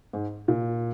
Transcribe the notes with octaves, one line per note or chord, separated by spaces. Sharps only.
G#2
A#2